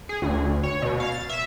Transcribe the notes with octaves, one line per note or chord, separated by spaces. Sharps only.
G#4
D2
C#5
B2
F5
A6
E5